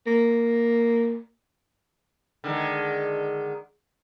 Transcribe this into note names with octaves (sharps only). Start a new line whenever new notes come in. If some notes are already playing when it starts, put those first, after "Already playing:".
A#3
D3 D#3 G#3